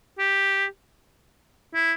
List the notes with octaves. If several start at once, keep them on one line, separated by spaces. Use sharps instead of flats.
G4
E4